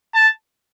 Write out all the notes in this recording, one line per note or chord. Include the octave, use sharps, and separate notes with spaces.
A5